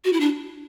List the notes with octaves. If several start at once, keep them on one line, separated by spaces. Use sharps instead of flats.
F#4
E4
D4